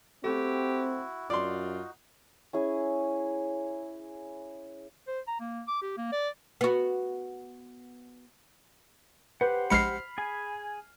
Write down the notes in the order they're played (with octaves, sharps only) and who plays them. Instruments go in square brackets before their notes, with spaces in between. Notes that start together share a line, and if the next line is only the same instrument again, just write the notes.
[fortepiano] A3 [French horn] C4 [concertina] E4 F#4 [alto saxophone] G4
[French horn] F#2 [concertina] D#4 F#4 [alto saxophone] F4 [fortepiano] D5 C6
[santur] C#4 E4 G#4
[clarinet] C5
A#5
A#3
D6
G4
A#3
D5
[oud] B3 F#4
[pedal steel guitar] G4 C5 F#5 [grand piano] B4
[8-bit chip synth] A#1 G#3 C#7 [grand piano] B5 F6 C7
[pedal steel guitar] G#4 G#5